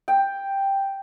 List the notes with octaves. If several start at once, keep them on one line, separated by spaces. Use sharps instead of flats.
G5